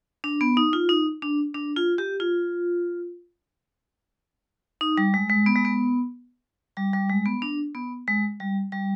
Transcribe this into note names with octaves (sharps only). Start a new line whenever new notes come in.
D4
B3
D#4
F4
D#4
D4
D4
F4
G4
F4
D#4
G3
G#3
G#3
B3
G#3
B3
G3
G3
G#3
B3
D4
B3
G#3
G3
G3